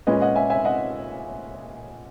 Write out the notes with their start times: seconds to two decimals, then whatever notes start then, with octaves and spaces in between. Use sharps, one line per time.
0.07 A#2 G#3 C#4 B4 D#5
0.21 D#5 F#5
0.35 E5 G#5
0.50 E5 G#5
0.65 D#5 F#5